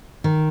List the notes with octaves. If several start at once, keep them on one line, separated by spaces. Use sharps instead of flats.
D#3